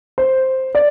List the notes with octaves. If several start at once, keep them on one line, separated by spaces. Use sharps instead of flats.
C5
D5